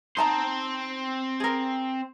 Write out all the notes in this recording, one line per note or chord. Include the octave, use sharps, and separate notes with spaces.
C4 D#4 C5 A5 A#5
G#4 A#4